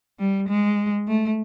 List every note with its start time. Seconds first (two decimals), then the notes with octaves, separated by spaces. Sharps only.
0.19 G3
0.48 G#3
1.08 A3